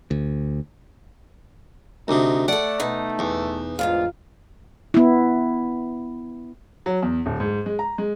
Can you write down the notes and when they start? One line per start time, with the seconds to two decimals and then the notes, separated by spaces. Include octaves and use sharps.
0.11 D2
2.08 D2 C3 D#4
2.48 A3 A4 D5 F#5
2.80 B2 D#4
3.19 E2
3.79 D2 G#2 F4 F5
4.94 B3 E4
6.86 F#3
7.02 E2
7.26 D1
7.40 G#2
7.66 G#3
7.79 A#5
7.98 G#3